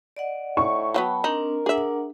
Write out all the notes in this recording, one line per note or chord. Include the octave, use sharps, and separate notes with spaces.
D5 D#5 F#5
A2 C#6
F3 F#3 B3 G5 A5 B5
C4 D4 D#4 A#4
D4 G#4 E5 F#5